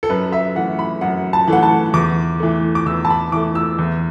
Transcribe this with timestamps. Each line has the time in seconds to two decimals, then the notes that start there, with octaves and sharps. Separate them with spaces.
0.03 A4
0.09 F#2 B4
0.32 E5
0.55 E3 A3 F#5
0.79 B5
1.01 F#2 F#5
1.33 A5
1.48 E3 A3 F#5
1.63 A5
1.93 E2 D6
2.40 E3 A3
2.75 D6
2.86 E2 E6
3.05 A5
3.10 B5
3.32 E3 A3 D6
3.55 E6
3.78 E2